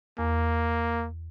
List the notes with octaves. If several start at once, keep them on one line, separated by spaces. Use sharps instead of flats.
E2 A#3